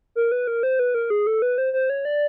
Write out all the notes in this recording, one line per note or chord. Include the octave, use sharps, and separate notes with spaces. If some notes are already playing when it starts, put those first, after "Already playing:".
A#4
B4
A#4
C5
B4
A#4
G#4
A4
B4
C5
C5
C#5
D5